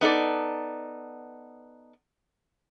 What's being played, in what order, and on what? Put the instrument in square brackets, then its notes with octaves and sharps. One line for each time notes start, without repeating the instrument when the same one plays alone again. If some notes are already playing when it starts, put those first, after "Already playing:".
[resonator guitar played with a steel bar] B3 D#4 A4 D5